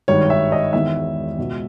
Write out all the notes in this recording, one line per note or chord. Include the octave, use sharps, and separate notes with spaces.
G#1 G2 D#3 C#5
E5
D#5
E1 E2 D#3 E5
C#2 B2